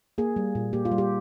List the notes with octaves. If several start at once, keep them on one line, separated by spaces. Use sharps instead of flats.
A#3 G#4
G3
A#2
A#3 G4
F4
G3
G4